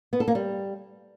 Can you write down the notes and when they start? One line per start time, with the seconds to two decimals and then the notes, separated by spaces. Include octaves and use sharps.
0.13 B3
0.20 A4
0.28 A#3
0.35 G3